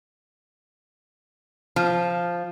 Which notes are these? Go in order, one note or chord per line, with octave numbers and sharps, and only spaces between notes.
F3